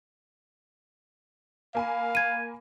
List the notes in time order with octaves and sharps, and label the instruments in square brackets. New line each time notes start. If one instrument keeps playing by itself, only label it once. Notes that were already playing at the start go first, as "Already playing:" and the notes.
[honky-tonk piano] A#3 G#5 B5 [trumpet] F5
[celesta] G#6 D#7